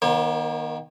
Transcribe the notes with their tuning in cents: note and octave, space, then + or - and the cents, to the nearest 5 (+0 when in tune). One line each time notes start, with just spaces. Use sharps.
D#3 +0 A#3 +45 C#5 -45